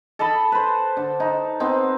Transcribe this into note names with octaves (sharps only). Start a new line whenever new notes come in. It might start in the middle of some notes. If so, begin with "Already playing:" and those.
A4 D#5 A5 B5
B4 C5
D3
D#4
B3 C4 D#4